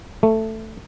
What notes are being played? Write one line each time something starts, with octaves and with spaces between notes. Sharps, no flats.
A3